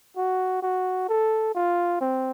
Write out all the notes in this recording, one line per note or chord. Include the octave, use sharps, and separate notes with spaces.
F#4
F#4
A4
F4
C4